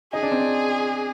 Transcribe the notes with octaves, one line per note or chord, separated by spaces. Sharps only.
D#4 G#4
D4
C4
D4